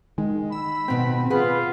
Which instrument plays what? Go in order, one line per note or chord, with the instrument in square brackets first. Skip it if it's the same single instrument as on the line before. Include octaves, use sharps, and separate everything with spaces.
[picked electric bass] D#3 [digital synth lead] G#3
[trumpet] B5 [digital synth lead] E6
[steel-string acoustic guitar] F2 B2 [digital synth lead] C4
[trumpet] F4 [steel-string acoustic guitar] G#4 B4 F#5